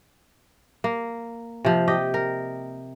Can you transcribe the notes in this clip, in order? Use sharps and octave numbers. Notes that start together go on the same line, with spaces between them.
A#3
C3 F3
G4 D#5
A#4